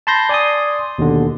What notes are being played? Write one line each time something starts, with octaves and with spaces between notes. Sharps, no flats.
A5 B5 C6 G6 A#6
D5 G#5 C6 D#6
D#2 B2 D3